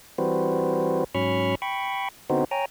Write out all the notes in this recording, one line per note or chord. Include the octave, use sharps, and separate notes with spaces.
E3 G3 C4 F#4 B4 C5
G#2 F#3 C#4 B5 C#6 F6
G5 B5 C#6
D3 B3 C4 D#4 F#4 C5
C#5 G5 G#5 A#5